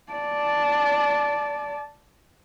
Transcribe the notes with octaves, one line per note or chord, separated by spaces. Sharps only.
D5 A5